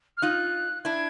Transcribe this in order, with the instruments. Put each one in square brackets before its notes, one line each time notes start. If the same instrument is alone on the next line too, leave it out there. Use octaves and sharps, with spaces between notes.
[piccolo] F6
[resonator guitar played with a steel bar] D#4 F4 [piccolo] F#6
[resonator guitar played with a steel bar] D4 E4 [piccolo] G#6